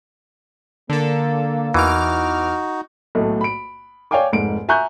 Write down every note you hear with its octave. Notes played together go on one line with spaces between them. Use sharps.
D3 A#3 A4
E2 E3 D#4 F#4 D6 F6
B1 A2 A3
B5 D7
C#5 D5 F5 G5 G#5 D6
F1 G#2 D7
E5 G#5 A#5 C#6 F#6 G6